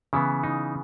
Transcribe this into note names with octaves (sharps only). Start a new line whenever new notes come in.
C#3 E3 B3 E4
D#4